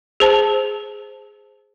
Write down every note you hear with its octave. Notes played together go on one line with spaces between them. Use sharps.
G#4 C5 A5